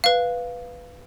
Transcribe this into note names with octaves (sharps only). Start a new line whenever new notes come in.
B4 F5